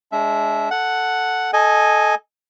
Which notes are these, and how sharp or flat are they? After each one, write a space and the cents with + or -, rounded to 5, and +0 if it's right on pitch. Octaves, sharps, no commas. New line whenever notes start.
G#3 +0 D4 -30 E5 +0
A4 +0 F#5 +0
A4 -20 D#5 +0 G#5 +0